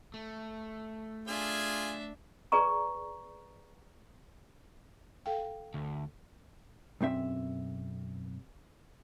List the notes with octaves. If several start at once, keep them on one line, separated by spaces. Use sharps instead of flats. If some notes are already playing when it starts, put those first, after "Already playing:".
A3
D4 F4 G#4 E5 G#5
G#4 B4 D5 A#5 C#6
A4 F5 G5
D2
B1 F#2 C4 E5